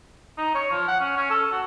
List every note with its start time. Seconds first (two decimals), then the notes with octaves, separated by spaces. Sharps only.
0.38 D#4
0.55 C#5
0.71 F3
0.88 F#5
1.00 C#4
1.17 C#4
1.30 A4
1.52 F#4